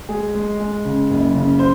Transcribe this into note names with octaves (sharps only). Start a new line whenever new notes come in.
G#3 G#4
G#3
G#3
C#3
F#1
C#3
C5